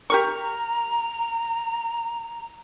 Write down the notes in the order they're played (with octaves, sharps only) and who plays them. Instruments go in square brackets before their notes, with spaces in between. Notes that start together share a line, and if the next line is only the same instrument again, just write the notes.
[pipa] G4 A#4 C#6 [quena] A#5